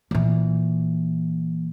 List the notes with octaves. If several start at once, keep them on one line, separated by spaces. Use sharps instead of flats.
A#2 E3